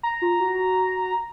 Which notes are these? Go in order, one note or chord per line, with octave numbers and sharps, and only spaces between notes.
A#5
F4
F#4